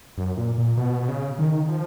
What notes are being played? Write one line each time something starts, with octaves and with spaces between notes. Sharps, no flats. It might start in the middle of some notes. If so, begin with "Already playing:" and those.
F#2
A#2
A#2
B2
B2
C#3
D#3
F3